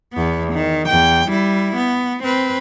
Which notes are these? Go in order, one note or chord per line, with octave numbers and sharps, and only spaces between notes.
E2 B3
D#3
E2 G5
G3 E4
B3
C4 B4